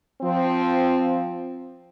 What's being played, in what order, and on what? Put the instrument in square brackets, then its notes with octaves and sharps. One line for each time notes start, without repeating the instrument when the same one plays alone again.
[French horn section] F3 C4